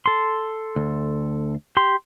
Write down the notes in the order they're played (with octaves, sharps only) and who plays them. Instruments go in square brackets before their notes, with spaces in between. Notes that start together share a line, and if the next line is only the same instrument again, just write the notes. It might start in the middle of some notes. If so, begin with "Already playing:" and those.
[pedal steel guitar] A4 C6
[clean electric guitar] D2
[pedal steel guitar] G4 C6